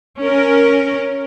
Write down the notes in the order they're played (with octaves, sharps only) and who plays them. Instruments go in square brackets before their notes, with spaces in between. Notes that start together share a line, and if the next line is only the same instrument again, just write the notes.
[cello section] C#4 A#4